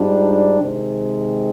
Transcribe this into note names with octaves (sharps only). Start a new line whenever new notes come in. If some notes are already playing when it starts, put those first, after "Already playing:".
Already playing: G#2 G3 D4 F4
C3 D#3 G#3 C4